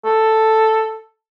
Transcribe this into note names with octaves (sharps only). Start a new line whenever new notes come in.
A4